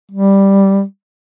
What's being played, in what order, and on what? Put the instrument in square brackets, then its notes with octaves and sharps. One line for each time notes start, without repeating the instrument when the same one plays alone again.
[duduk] G3